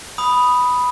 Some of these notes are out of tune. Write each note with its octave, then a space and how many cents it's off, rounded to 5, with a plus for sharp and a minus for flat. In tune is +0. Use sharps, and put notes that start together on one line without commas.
B5 +0 D#6 +0